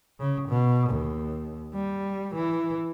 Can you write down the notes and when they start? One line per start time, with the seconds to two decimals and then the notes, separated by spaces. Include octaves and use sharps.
0.19 C#3
0.49 B2
0.90 D#2
1.74 G3
2.35 E3